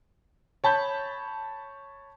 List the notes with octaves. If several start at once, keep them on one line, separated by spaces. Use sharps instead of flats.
C#5 A5 B5 G6